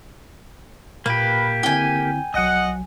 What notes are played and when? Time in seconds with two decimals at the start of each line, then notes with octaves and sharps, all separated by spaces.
1.06 A#2 A#3 G4 B4
1.63 D3 C4 E4 G5 G#5
2.34 B1 F#3 D#5 F#5 D#6